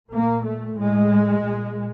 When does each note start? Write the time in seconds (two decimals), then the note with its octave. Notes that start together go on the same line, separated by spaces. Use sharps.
0.10 A#2 A#3
0.43 A3
0.76 A2 G#3
1.43 A#2